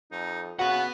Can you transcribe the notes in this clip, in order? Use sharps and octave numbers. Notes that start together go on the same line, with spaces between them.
F2 D#4
C#3 F#4 B4 F#5 B5